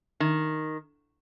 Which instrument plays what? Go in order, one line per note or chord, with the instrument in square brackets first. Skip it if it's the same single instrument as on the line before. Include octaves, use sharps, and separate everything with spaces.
[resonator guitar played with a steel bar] D#3